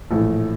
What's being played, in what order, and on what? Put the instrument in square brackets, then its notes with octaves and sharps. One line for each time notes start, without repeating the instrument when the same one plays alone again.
[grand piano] A#1 A2 E3 A3